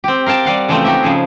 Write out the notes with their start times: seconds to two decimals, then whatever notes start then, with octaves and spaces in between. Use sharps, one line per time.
0.04 C4 G4
0.26 A#4 F5 G5 A5
0.45 G3 F5 F#5
0.68 C#3 E3 F3 A3 C4
0.84 D#4 F#4 G4 E5
1.02 C#3 F3 G#4